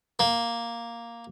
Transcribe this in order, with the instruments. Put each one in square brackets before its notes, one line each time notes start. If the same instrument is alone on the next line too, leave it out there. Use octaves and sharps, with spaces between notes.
[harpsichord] A#3